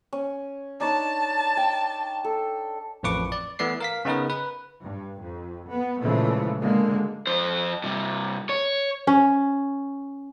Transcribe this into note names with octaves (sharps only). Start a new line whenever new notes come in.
C#4
D4 D#4 C#5 A5
G5
A4
A1 F2 A2 B4 C#6 D6
D5
E3 A3 B3 D5 C7
A#4 F5 B6
C#3 B3 D#4 A#4 B4
B4
G2
F2
B3
A#2 C#3 E3 F3 G#3 A3
B2 D3 G#3 A#3
F2 C5
G2 C3
C#5
C#4